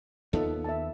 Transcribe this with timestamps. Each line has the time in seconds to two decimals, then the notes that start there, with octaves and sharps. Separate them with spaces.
0.33 D#2 B3 D#4 F4 A4
0.64 E5 A5